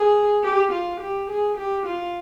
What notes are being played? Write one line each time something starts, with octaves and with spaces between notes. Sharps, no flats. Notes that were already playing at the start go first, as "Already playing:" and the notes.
Already playing: G#4
G4
F4
G4
G#4
G4
F4